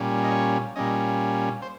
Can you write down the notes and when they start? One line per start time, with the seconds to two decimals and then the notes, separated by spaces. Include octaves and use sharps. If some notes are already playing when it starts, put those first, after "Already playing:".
Already playing: A#2 G3 C#4
0.23 D#5
0.31 C#5
0.76 A#2 G3 C#4 D#5
1.62 C5